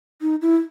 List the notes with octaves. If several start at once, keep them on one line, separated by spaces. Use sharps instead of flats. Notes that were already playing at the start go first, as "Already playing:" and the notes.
D#4
E4